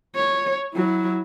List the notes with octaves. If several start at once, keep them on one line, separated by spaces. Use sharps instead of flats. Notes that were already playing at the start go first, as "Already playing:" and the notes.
C#5
F#3 E4